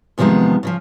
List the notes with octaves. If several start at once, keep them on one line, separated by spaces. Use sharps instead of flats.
E2 C3 D#3 F3 G#3 B3
C#3 E3 F3